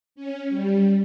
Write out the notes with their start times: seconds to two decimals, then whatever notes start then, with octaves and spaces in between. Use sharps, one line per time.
0.15 C#4
0.49 G3